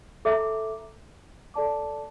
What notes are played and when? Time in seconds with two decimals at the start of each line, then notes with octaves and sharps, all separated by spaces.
0.25 A4 E5 A#5 D6
1.54 A4 D5 A5 D6